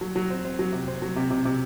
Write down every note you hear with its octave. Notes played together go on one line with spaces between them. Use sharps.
F#3
F#3
C4
C4
F#3
C3
C4
F#3
C3
C3
C3